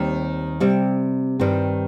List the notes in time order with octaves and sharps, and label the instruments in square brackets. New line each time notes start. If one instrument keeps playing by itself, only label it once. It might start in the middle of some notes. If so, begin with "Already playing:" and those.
Already playing: [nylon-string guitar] D#2 D#3 G3 C4
C3 G3 C4
G2 D#3 G3 C4